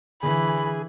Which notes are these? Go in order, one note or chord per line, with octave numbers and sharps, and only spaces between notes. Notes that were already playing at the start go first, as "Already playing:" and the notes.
D3 E3 G#4 B5